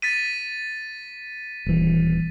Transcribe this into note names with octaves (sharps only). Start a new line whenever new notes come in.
A6 B6 D#7
D#1 E3